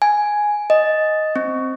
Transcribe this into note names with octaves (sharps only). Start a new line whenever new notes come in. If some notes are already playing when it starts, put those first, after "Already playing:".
G#5
D#5
C4